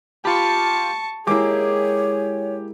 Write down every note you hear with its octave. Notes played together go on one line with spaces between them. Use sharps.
F4 G4 A5 B5 C#6
G#3 A#3 E4 G4 G#4 C#5 G#5 D6